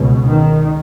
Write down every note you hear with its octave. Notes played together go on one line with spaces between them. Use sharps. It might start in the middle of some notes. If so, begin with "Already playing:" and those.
Already playing: C#2 B2
D#3